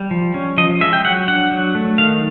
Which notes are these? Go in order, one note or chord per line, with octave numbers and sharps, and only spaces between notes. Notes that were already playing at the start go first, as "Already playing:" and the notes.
Already playing: G3
F3
C#4
F3 D#5
G#3 E5
G5
F#3 F#5
D4 F#5
F#3
A3
D#3 F5